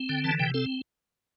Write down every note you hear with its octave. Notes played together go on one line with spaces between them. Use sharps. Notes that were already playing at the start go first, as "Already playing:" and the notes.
Already playing: C4
D3 G5
E3 A5
C3 G5
C4 A4